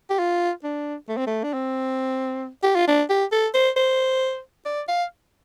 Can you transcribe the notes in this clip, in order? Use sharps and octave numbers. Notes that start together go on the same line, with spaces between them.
G4
F4
D4
A3
C4
A3
D4
C4
G4
F4
D4
G4
A4
C5
C5
D5
F5